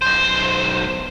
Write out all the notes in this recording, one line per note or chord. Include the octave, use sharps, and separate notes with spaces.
B1 C5